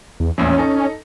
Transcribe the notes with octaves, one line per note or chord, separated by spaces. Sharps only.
E2
A#1 E2 A2 C#4
D#4 A4